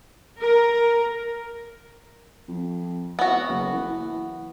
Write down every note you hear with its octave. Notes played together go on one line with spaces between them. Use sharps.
A#4
F2
B3 F#4
F#1
E3